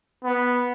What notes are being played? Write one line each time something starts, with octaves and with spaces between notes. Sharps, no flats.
B3